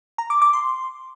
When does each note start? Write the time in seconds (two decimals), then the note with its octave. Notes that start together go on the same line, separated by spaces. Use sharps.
0.18 A#5
0.30 D6
0.42 D6
0.53 C6